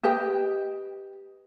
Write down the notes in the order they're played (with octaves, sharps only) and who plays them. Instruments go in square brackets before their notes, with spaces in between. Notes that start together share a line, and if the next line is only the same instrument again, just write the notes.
[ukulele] G4 B4 D#5 G5